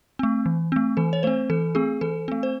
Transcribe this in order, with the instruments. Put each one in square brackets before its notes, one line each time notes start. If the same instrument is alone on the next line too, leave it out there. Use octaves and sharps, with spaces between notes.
[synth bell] A3 C4
E3
A3 C4
E3 A4
C#5
A3 C4 C5
E3 A4
A3 C4 G#4
E3 A4
A3 C4
C5